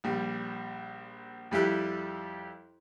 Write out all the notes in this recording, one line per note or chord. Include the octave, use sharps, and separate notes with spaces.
A#1 G3
F2 G3 E4 G4 F#6